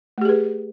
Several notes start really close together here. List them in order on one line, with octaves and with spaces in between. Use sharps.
A3 G4 G#4 B4